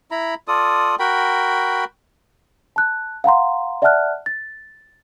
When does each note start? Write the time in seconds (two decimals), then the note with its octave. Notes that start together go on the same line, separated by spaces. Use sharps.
0.11 E4 A#5 B5
0.48 F4 A4 D5 D#6
0.99 F#4 A#4 G5 B5
2.76 A5 F#6
3.24 F5 F#5 A#5 C6
3.82 D5 E5 F#5 A5 F6 F#6
4.26 A6